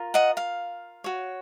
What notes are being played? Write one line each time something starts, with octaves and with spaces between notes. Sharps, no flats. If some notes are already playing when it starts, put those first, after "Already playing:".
Already playing: F4 A#4
D#5 F#5
F5
F#4 C#5